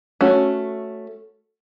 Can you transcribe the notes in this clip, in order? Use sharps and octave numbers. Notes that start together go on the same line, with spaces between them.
A3 C#4 F#4